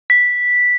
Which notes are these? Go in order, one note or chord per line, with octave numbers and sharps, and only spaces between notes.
B6